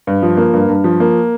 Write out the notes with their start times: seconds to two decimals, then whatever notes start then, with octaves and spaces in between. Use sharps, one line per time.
0.07 G2
0.22 F3
0.37 A#3
0.54 G2
0.68 G2
0.84 F3
1.00 A#3